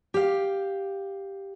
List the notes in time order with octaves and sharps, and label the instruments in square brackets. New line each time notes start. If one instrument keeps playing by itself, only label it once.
[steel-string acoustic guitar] G4 F5